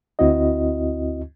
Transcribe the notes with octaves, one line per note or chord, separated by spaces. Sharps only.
D2 C4 E4 F#4 D#5